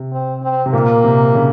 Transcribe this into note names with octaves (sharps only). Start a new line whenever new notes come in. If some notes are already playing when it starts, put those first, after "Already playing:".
Already playing: C3
C4
C4
C3
A#2 A#3
C3
C#3